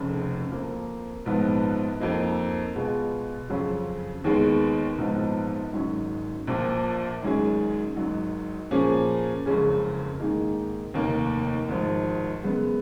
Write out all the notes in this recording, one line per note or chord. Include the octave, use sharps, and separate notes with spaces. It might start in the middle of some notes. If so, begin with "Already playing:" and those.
Already playing: F1 F2 C#3
F2 F3 A#3
A#1 G#2 F3 B3
F2 F3 A#3 D#4
B2 G#3 B3 F4 G#4
F2 C#3 F#3 C#4 F4
D#2 D#3 G#3 B3
A#1 G#2 F3 B3 D#4
G#1 G#2 F#3 C#4
A#1 A#2 F3
G#1 G#2 F#3 C#4 G#4
G#1 G#2 D#3 F#3
A#2 F3 A#3 C#4 G#4
F#1 F2 C#3 G#3 C#4
G#2 D#3 A#3 D#4 G#4
F1 D#2 D#3 A#3 D#4
G#1 G#2 F3
F#2 C#3 G#3 B3